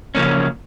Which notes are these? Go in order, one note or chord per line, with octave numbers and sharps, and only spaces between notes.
C#3 F3 A#3 C#4